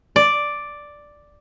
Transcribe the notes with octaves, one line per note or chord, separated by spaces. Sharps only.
D5